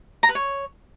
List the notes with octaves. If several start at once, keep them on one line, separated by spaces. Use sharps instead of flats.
A#5
B4
C#5